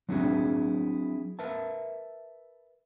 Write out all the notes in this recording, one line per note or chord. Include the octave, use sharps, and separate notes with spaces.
F#3 C4 D4 E4 F#4 G#4
A#4 B4 E5 A5